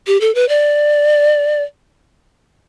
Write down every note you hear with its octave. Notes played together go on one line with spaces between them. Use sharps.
G4
A4
B4
D5